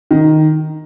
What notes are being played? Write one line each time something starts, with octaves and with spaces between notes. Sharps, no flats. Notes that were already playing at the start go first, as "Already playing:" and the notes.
D#3